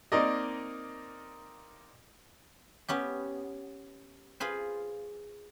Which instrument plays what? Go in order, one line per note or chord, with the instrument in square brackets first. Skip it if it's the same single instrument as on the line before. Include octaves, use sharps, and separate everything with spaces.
[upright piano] A#3 C4 D#4 A#4 D5 D#5
[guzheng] B3 C#4 G4
F4 G#4 B4 C5